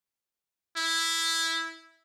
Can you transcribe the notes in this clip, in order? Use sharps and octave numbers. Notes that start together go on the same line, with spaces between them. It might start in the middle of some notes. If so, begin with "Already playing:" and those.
E4